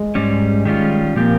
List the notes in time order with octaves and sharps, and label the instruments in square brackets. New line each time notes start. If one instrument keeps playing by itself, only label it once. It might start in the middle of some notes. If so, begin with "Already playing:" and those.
Already playing: [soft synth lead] G#3
[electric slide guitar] G#2 G3 C#4
D#3 G3 C#4 F4
[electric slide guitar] A#2 F3 C4 G4 [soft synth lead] A#3